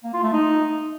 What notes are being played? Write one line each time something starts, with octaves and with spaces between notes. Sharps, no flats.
A#3
F4
A3
D#4